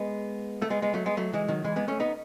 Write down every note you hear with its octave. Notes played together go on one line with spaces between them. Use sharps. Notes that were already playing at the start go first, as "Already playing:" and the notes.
Already playing: G#3 B3
A3
G#3 B3
G#3 B3
F#3 A3
G#3 B3
F#3 A3
E3 G#3
D#3 F#3
E3 G#3
G#3 B3
A3 C#4
B3 D#4